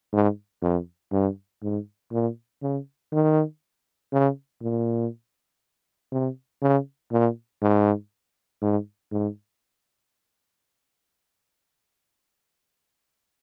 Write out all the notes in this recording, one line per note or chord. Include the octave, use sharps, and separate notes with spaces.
G#2
F2
G2
G#2
A#2
C#3
D#3
C#3
A#2
C3
C#3
A#2
G#2
G#2
G#2